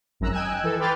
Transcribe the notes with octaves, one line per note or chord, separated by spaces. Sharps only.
G#1 F#2 A#5 E6 F#6
D#5 G5 G#5 E6 F#6 G#6
E3 A4
B4 G5 C6 D6 F6 A6